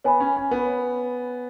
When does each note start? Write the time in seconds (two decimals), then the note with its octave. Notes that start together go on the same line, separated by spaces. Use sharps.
0.04 B3 C#5 G#5 B5
0.20 C#4
0.37 C#4
0.51 B3